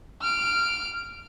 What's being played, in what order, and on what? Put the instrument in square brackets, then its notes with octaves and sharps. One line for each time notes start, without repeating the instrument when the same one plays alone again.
[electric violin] F6 D7